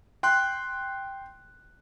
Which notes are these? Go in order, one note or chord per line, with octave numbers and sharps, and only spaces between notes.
G5 C6 F#6